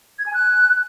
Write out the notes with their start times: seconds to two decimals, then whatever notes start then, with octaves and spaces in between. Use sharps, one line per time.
0.19 G#6
0.26 G#5
0.34 F#6